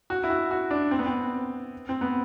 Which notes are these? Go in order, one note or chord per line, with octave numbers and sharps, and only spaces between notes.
F#4
E4
F#4
F#4
D4
C4
B3
C4
C4
B3